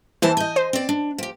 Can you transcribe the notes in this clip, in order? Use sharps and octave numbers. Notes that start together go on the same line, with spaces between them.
D#2 E3 C5 A5
D#5 G#5 G6
C5
C4 D5
D4
F3 G4